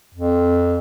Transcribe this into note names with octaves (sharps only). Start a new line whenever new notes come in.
F2